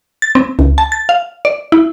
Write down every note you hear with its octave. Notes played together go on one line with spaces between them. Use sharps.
A6
C4
C#2
A5
A6
F5
D5
E4